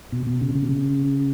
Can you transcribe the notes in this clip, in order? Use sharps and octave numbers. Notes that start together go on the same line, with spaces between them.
B2
B2
C#3
C#3
B2
C#3